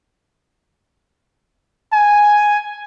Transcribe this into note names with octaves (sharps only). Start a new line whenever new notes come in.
G#5